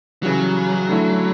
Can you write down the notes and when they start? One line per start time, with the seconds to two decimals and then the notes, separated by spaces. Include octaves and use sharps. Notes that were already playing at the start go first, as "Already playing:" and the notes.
0.23 C#3 E3 F#3 G3
0.89 D3 A3 E4